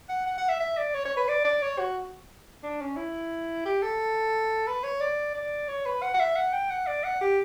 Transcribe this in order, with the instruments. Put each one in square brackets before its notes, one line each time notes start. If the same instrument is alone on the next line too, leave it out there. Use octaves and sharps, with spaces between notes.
[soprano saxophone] F#5
F#5
F#5
E5
E5
D5
C#5
C#5
B4
D5
D5
C#5
F#4
D4
C#4
E4
G4
A4
B4
C#5
D5
D5
C#5
B4
F#5
F#5
E5
F#5
G5
F#5
D5
F#5
G4